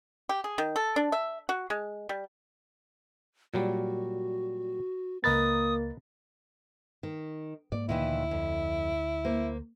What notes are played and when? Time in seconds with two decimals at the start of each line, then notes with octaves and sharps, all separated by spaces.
0.29 G4
0.44 G#4
0.58 D#3
0.76 A4
0.96 D4
1.12 E5
1.49 F#4
1.70 G#3
2.09 G3
3.54 A#2 F#3 G3 F#4
5.24 C#2 A#3 A#4 B4 D#5 D#6 A6
7.03 D#3
7.72 G#2 A#3 D5
7.89 D2 A#2 D#3 E3 E4
8.31 F2
9.25 A#3 C5